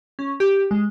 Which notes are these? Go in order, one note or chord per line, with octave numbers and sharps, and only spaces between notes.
C#4
G4
G#3